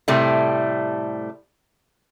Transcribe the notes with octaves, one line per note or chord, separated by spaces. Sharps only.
A2 C3 G3 A3